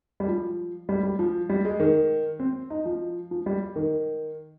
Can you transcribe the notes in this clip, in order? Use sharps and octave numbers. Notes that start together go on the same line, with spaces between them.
G3
F3
G3
G3
F3
G3
G#3
D#3
C4
D#4
F3
F3
G3
D#3